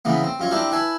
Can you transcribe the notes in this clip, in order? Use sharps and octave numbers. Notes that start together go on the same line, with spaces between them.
C#3 E3 A#3 B3
C4
F#2 F4 C#5
C4 D4 E4 G4 A#4
E4 B4 G#5 A5